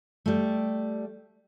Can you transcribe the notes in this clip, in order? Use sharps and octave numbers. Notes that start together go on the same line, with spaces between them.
G3 A3